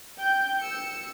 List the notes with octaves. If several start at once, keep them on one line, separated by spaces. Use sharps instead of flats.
G5 G6
E6 C#7